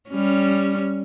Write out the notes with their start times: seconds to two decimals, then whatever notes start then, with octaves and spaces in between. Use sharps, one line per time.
0.10 G3 C#4